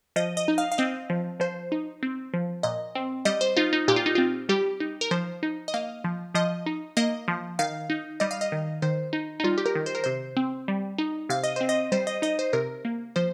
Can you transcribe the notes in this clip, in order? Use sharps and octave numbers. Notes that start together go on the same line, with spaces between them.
F3 D#5
D#5
D#4
F5
F5
C4 D#5
F3
F3 C5
D#4
C4
F3
A#2 D#5
C4
G3 D#5
C5
D#4 F4
D#4
A#2 G4
F4
D#4
C4 F4
G3 G4
D#4
A#4
F3 C5
D#4
D#5
A#3 F5
F3
F3 D#5
D#4
A#3 D#5
F3
D#3 F5
D#4
G3 D#5
F5
D#5
D#3
D#3 C5
D#4
D#4
G3 F4
G4
A#4
D#3
C5
A#4
C3 C5
C4
G3
D#4
C3 F5
D#5
C4 C5
D#5
G3 C5
D#5
D#4 D#5
C5
C3 A#4
A#3
F3 C5